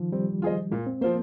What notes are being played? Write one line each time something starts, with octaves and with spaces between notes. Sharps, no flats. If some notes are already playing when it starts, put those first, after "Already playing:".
Already playing: D#3 F3
G3 C4
F4 G#4 C5 D#5
A#2 G#3
C4
F3 A#3 C4 F4 C5